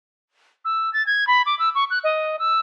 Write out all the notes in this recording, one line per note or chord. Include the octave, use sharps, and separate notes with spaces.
E6
A6
G#6
B5
D6
E6
C#6
F#6
D#5
E6